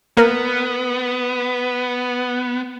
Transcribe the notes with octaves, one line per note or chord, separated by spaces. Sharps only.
A#3 B3 A#4